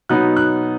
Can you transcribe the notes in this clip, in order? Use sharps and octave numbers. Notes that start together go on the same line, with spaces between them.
B2 F#3 B3 D#4 F#6
F#6